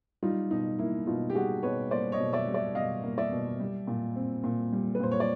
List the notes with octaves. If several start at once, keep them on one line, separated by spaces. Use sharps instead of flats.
G3 D#4 F4
B2 D#4
A#3 E4
B2 D#4 F4
G4
G3 F#4 G#4
B2 B4 C#5
A#3 C5 D5
C#5 D#5
B2
D5 E5
G3
D5 E5
B2 D#5 F5
A#3
D5 E5
B2
G3
A#2
C4
A#2
G3
B4
A#2 C5
C#5
D5